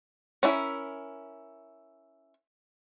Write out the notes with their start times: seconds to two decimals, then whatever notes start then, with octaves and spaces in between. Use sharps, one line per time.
0.43 C#4 D4 E4 A#4 E5